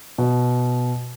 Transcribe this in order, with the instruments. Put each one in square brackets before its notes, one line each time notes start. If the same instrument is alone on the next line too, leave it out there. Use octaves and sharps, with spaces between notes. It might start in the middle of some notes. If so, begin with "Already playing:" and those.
[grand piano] B2